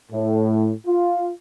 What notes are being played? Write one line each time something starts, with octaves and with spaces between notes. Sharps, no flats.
A2
F4